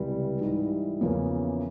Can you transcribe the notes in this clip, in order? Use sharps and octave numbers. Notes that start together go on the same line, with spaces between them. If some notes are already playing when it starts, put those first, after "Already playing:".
Already playing: C#2 C3 E3 G3
G#2 E3 G3
E2 C#3 F3 A#3 C#4